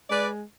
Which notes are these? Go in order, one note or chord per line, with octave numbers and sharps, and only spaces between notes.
G#3 B4 D5